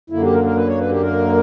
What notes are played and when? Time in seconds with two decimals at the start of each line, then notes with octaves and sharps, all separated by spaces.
0.10 F#2 D3 A#3 E4
0.22 G4
0.34 A#4
0.44 A#4
0.56 B4
0.67 C#5
0.78 B4
0.90 G4
1.01 A#4